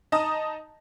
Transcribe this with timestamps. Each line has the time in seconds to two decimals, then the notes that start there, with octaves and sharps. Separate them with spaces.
0.12 D#4 D#5 A5 A#5 D#6